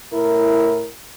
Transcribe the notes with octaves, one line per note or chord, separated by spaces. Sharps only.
A2 E4 A#4